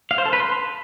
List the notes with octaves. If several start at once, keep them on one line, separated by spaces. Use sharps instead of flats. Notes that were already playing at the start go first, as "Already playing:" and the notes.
F5
C5
A4
B4
C6